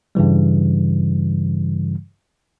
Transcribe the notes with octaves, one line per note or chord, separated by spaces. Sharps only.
G2 C#3 E3 G3